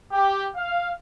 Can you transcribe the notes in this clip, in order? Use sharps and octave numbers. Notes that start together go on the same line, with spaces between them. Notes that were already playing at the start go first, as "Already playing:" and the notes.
G4
F5